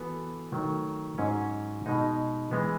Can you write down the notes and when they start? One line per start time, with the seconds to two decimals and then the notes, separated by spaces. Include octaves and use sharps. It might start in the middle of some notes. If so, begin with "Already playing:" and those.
Already playing: E3 B3 F#4 A4
0.52 D#3 F#3 A3
1.18 G#2 F#3 C#4 G#4
1.85 B2 G#3 D#4 G#4
2.51 E3 G#3 B3